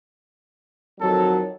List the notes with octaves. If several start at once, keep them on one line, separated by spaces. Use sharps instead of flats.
F2 D#3 F#3 A4